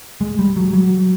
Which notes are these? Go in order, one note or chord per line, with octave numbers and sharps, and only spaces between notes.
G#3
G3
F#3
F#3